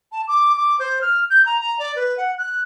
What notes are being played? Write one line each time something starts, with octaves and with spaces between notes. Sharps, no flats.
A5
D6
D6
C5
F6
G6
A#5
A#5
D5
B4
F#5
F#6